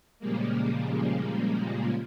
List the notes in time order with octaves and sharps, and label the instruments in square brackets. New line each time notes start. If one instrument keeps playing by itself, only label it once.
[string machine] A#2 C#3 F3 G3 G#3 A#3